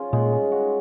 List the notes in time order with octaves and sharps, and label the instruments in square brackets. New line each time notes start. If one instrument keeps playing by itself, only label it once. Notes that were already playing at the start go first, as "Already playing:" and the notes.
Already playing: [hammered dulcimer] C#4 F4 G#4
[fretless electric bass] A#2 [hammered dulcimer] G#3
[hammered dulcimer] G#3
F#4